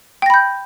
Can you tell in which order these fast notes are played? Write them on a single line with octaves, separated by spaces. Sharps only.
G5 A#6 B5 G6